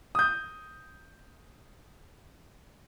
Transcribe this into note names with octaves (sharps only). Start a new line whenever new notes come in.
D#6 G6